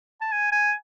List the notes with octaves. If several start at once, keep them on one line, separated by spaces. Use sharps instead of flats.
A5
G#5
G#5